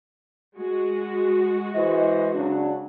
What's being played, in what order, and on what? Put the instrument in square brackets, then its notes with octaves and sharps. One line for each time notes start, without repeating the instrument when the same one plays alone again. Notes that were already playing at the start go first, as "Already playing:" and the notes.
[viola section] G#3 F#4
[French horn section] E3 C5 D#5
C#3 F#3 D4